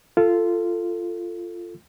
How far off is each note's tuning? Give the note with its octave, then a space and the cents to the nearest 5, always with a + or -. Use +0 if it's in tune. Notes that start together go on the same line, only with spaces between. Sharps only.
F4 -10 A4 +10